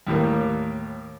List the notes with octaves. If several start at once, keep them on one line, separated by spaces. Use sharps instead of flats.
D#2 A2 G3 A#3